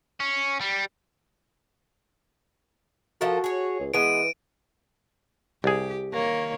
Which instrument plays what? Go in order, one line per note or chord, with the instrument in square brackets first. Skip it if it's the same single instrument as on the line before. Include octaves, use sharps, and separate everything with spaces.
[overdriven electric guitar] C#4
G3
[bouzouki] F3 A4 A#4 [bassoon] F#4
[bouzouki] G#4 C#5
[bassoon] C#2
[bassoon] E3 [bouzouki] G#3 B3 [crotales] D7 D#7
[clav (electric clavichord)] C2 G#4 [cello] G4
[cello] D#3 C#5 [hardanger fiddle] A#3